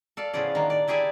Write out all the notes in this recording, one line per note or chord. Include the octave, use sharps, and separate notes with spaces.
A4 D5 F5
A2 C#3 F3 B3 G#4 D5
D#3 A#3 D4
D5
E4 G4 G#4 D5 E5 G#5